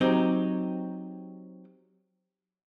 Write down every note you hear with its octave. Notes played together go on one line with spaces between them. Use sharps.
F#3 C4 D#4 G4